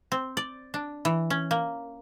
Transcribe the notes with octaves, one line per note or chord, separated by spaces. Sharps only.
C4
D5
D4
E3
C#4
A#3